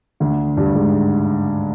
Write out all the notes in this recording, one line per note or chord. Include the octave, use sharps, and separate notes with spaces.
D2 D3
G2 G3
G#2 G#3